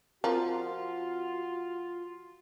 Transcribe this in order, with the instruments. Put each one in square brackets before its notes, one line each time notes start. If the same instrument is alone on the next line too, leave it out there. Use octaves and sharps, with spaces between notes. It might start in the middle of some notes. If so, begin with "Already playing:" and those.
[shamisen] F3 [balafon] C4 A#4 A#5 [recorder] F4 [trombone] F#4